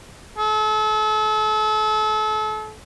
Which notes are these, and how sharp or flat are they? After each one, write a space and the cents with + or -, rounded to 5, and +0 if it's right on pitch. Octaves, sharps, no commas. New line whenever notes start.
A4 -35